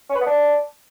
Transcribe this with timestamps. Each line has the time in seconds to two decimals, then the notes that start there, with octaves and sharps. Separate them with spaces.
0.09 C#4
0.15 B4
0.21 B3
0.26 D4